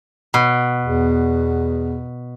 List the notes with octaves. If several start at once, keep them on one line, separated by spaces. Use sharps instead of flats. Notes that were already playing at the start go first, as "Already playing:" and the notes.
B2
E2